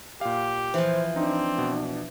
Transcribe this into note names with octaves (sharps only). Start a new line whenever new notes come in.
A#2 G4 F5
E3 F3 C5
C4 D4 D#4
B2